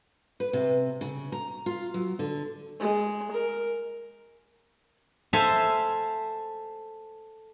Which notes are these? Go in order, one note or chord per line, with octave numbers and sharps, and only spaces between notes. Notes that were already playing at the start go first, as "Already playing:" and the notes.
B4
C3
C#3
A#5
F4
F#3
D3
G#3
A#4
A4 C5 E5 F5 G#5